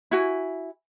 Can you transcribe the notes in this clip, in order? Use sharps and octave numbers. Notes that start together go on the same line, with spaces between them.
E4 F#4 G#5